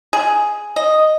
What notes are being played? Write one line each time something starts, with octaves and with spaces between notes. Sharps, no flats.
G#4
D#5